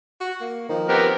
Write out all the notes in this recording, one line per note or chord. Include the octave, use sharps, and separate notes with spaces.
F#4
A#3
D#3 F3
B3 C4 G4 A#4